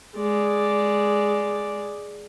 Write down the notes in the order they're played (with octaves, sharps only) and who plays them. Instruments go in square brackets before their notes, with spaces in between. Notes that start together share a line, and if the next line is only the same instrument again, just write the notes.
[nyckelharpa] G#3 D5